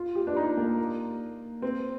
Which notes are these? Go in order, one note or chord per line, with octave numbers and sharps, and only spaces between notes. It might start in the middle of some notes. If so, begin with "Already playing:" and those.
Already playing: F4
G4
D4
D#4
A#3
C4